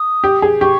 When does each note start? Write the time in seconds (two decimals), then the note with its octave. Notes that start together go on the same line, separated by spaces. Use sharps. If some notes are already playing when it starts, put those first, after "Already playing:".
Already playing: D#6
0.24 G4
0.42 G#4
0.60 G4 C#6